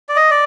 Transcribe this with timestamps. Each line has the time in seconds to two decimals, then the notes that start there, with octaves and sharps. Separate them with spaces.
0.09 D5
0.16 D#5
0.31 D5